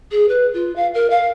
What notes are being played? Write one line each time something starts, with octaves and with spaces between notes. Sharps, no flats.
G#4
B4
F4
F5
A#4
F5